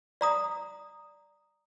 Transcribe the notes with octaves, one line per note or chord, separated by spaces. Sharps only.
D5 A#5 D#6